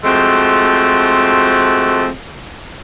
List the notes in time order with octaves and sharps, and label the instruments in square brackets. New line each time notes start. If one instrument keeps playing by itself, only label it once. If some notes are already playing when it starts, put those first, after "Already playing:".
[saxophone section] F3 G#3 A3 C4 F#4